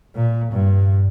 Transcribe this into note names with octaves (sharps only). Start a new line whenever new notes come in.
A#2
G2